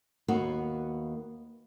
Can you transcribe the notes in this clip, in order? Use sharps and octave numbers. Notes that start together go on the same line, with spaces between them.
D#2 A#3 B3 F#4